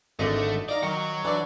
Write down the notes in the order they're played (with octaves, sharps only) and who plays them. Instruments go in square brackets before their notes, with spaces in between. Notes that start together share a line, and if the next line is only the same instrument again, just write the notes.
[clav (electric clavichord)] G#1 D3 D5 [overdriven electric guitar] A3 [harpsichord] D#5
[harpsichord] D#4 F5 A#5 [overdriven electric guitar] D5
[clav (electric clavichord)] D#3 [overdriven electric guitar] F#4 C#5
[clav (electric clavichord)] E3 [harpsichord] D4 D5